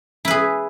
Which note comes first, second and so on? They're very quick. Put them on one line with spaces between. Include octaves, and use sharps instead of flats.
E4 B4 G#4